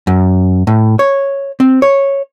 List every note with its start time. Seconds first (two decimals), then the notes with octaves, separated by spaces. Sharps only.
0.07 F#2
0.67 A2
0.99 C#5
1.60 C4
1.82 C#5